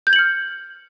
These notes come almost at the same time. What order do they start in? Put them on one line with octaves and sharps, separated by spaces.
G6 G#6 F#7 C#7 F6